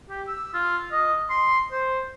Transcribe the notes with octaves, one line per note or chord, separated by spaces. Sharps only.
G4
E6
F4
D#5
C6
C5